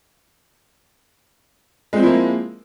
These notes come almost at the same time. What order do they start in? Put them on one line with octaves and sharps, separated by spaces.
G#3 C4 F3 E4 A#3